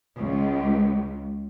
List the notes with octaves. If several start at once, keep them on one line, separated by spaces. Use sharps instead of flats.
C#2